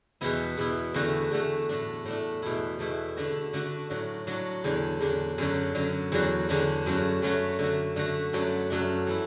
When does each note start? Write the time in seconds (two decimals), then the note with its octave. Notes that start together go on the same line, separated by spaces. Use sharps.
0.21 E2 B2 B3 E4
0.57 E2 B2 B3 E4
0.94 E2 D3 A3 F#4
1.31 E2 D3 A3 F#4
1.69 A2 A3 D4
2.05 A2 A3 D4
2.42 E2 B2 A3 E4
2.79 E2 B2 A3 E4
3.17 D3 A3 D4 F#4
3.53 D3 A3 D4 F#4
3.90 A2 F#3 D4 F#4
4.27 A2 F#3 D4 F#4
4.64 E2 D3 F#3 D4
5.01 E2 D3 F#3 D4
5.38 F#2 D3 F#3
5.74 F#2 D3 F#3
6.12 E2 D3 F#3 D4 F#4
6.49 E2 D3 F#3 D4 F#4
6.86 F#2 F#3 A3 F#4
7.22 F#2 F#3 A3 F#4
7.59 D3 A3 F#4
7.96 D3 A3 F#4
8.33 F#2 F#3 A3 D4
8.70 F#2 F#3 A3 D4
9.07 E3 A3 E4